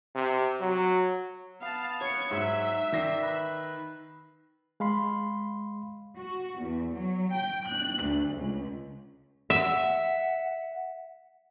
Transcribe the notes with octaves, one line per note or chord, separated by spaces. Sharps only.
C3
F#3
B3 F5 A5
C#5 G#6 C#7
G#2 F#3 E5
D#3 D5 A#6 C7
B4
G#3 F5 B5 C6
F#4
E2
F#3
G5
F#6
D2
C#2
E5 F#5